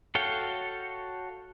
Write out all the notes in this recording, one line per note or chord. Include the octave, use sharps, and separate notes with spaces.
F#4 A4 C#5 F5 G5